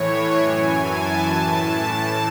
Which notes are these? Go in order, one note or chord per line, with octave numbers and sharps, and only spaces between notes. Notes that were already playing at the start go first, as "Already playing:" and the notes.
Already playing: A2 E3 C#5
F#2 E3 G#5
A5
A2 E3 A5